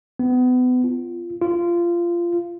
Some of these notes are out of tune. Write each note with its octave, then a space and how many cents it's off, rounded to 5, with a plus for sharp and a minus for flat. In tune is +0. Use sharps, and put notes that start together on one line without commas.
B3 +30
F4 -20
F4 -20